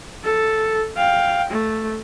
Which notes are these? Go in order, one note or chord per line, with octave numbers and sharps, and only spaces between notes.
A4
F5 G5
A3